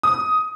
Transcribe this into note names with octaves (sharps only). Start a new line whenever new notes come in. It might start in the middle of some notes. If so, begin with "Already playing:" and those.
D#6